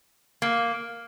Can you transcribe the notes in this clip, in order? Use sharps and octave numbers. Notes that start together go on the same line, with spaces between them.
A#3